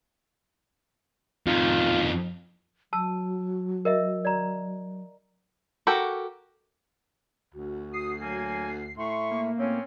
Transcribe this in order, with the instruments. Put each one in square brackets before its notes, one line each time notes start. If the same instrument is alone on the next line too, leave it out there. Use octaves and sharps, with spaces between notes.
[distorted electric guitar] F2 D#3 [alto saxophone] F4
[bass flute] F#3 [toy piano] A5 E6
[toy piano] A#4 D#5 E5
D5 A#5
[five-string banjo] F#4 G4 A4 A#4
[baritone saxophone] D2 [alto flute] F#4
[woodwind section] D#6 [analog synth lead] C7
[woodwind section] F#3 A#3 G#5
[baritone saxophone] A2 [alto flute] E5 [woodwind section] C6 C#6
[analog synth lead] A#3
[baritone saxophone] A2 [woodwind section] C4 C#4 [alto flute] C#5